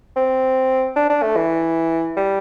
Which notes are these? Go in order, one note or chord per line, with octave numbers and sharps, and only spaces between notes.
C4
D4
D4
A3
E3
G3